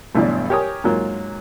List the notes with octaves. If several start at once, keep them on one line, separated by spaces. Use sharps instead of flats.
A1 G2 B2 E3 F#3 D5
G4 A#4 C#5 G#5 D#6
G#2 F#3 A#3 F4